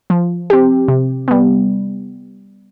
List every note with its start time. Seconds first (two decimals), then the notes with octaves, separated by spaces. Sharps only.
0.10 F3
0.50 C4 G4
0.88 C3
1.28 G3 B3